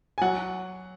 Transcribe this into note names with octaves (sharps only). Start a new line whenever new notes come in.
G#5
F#3 F#5